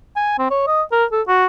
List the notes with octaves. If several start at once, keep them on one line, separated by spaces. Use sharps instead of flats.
G#5
C4
C#5
D#5
A#4
A4
F#4